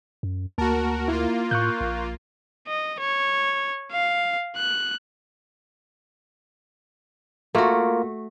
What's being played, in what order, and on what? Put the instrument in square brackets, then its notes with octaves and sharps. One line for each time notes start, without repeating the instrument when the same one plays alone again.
[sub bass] F#2
[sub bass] D2 [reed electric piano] A#3 A5 [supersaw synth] F#4 A#4
[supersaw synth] A#3 F4 [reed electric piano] E4
[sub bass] A2 [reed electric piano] C#6 F#6 G6
[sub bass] A#1
[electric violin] D#5
C#5
F5
F#6
[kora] A3 F#4 [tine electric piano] A#3 F4 A#4